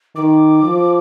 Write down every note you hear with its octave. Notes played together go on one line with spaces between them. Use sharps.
D#3 D6
F3